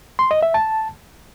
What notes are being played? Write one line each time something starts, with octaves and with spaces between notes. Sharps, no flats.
C6
D#5
E5
A5